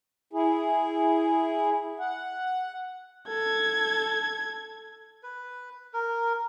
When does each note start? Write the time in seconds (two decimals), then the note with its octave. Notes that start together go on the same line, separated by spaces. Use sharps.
0.33 E4 G#4
2.00 F#5
3.28 A4 G#6
5.23 B4
5.93 A#4